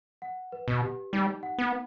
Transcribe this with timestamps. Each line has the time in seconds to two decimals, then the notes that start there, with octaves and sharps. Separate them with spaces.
0.22 F#5
0.52 B4
0.68 B2
0.83 G4
1.13 G3 D#4
1.43 F#5
1.58 B3